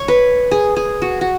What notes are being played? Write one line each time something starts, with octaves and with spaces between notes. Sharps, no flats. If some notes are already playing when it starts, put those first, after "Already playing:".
Already playing: C#5
B4
G#4
G#4
F#4
F#4